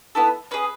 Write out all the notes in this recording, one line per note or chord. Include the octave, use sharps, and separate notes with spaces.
B3 E4 A4
C#4 G#4 B4